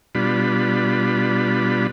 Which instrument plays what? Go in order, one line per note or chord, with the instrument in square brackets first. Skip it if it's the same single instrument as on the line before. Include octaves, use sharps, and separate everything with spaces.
[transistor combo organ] B2 G3 D4 F4 B5